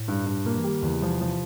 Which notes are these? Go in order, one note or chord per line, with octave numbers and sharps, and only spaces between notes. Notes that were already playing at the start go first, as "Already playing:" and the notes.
Already playing: A2
G2
G2
A#2 A#3
E3
G3
D#3
E2 D3
C#3
C3 F3
F3